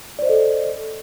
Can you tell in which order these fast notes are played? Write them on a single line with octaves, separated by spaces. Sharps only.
D5 C5 D#5 A4